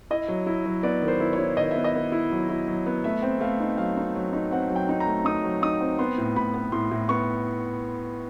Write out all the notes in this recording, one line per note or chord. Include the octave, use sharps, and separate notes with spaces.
E4 D#5
F#3
E4
F#3
B3 D5
D#3
C5
E4
C#5
E4
D#3 D#5
E5
B3
D#5
B3
E4
F#3
E4
F#3
B3
A3 E5
C4
A3 F5
D#4
F#3 F5
D#4
F#3
D#4
C4 F#5
F#3
G5
D#4
A#5
A3
D#4 D#6
F#3
D#4 D#6
C4
B3 C6
A2
A2 B5
B3
A2 C6
A2
B3 C#6